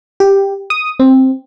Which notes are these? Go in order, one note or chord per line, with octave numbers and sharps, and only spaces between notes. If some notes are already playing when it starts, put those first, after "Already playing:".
G4
D#6
C4